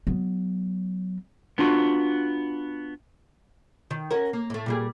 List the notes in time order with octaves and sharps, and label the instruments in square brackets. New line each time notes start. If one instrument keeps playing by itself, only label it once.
[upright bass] F#3 B3
[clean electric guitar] B3 D4 F4 F#4
[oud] D#3
C#4 F#4 A#4
A#3
A2 A3
A#2 G3 G#4